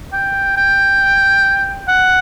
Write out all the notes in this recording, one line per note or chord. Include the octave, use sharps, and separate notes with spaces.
G5
G5
F#5